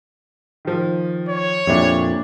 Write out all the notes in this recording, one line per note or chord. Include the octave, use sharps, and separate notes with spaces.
D#3 F3
C#5
F2 A#2 D4 E4 G4